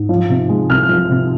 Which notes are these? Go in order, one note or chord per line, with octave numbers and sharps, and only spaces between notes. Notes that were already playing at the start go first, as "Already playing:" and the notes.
Already playing: G#2
F3
C3
G#3
C2 F6
F3
C3